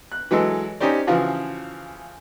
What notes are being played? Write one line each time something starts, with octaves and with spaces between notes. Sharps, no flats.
F#6
E3 F#3 G#3 A4
C#4 D#4 G4 C5 D5
C#3 E3 F3 F4 F#4